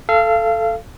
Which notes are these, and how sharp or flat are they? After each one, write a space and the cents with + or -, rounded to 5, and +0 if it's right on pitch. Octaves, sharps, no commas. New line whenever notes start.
A4 +0 F5 -30